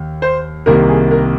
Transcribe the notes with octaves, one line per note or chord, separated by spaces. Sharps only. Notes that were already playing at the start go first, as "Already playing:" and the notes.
Already playing: D#2
C5
C2 C3 D#3 A#3 A#4
G#4
A#4